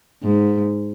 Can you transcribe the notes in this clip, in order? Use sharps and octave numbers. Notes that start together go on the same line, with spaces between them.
G#2